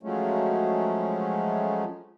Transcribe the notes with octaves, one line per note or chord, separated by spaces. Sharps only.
F3 F#3 G#3 A3 C#4